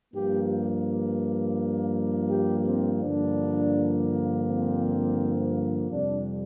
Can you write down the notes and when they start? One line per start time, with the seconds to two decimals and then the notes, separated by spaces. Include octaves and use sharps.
0.14 G2 F3 A#3 G4
2.30 G4
2.66 C4
3.02 G2 D3 F3 A#3 D4
4.46 C4
5.90 F2 C3 G3 D4